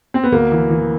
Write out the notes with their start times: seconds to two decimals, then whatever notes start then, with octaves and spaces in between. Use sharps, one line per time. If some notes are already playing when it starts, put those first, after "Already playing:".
0.14 C4
0.24 B3
0.32 D2 A#3
0.52 E3
0.71 E3